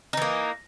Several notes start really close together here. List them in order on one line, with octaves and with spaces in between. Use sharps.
D#4 E3 A#3